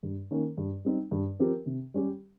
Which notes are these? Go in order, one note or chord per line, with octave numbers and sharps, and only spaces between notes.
G2
D#3 A#3 C#4
G2
G3 C4 D#4
G2
F3 C4 G4 A#4
C3
G3 C#4 G4